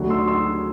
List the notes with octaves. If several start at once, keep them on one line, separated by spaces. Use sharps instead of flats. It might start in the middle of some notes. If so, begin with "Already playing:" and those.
Already playing: D2 D3 F#3
C6 E6
C6 E6